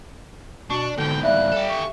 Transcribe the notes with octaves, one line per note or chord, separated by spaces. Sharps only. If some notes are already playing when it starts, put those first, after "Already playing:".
B2 D4 A5 C#6
G#2 B2 D3 G5
G3 E5 F5 F#6
G4 A4
C#6